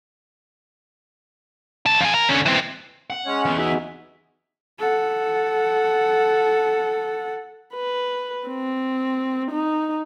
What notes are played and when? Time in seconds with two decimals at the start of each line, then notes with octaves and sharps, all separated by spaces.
1.86 C2 A4
2.01 F2 G#4
2.14 A#4
2.29 D3 C#4
2.46 E3 C4
3.10 F#5
3.26 G#3 C#4 C#5
3.45 E3 B3
3.58 D#4 F#4 G#4 E5
4.79 A4 F#5
7.75 B4
8.48 C4
9.51 D#4